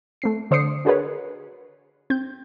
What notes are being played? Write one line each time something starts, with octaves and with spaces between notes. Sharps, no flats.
A3 C4 C7
D3 C5 D5 D#6 C7 C#7
D4 F#4 G#4 A#4 B4 C#5
C4 G6